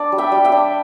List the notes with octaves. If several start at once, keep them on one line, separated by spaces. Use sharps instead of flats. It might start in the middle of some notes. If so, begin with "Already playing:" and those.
Already playing: D4 D5
G3
E5 G5
G3
E5 G5
D4